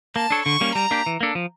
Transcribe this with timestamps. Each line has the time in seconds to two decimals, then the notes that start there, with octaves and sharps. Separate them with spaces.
0.16 A#3 A5
0.30 D4 A4 C#5
0.46 D3 C#6
0.61 G3 A#3 C#4
0.75 G3 A#5
0.91 A#3 D4 G4
1.06 E3
1.21 A#3 D4 A4
1.35 F3